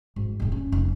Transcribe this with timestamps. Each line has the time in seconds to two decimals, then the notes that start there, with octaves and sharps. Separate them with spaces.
0.16 G#1
0.40 D#1 G2
0.52 C#4
0.72 F1